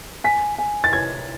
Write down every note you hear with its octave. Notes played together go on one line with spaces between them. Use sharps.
G#5 B6
G#5
A6
C#5 G#6